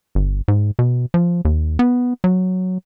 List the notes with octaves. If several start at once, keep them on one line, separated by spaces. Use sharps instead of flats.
G1
G#2
B2
F3
D#2
B3
F#3